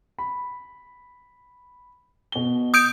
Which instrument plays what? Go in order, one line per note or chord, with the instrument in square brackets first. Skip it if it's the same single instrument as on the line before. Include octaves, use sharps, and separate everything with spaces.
[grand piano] B5
B2 G7
[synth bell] D#6 G6 D7